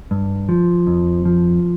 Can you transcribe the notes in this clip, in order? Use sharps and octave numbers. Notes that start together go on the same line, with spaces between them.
G2
F3
F2
F3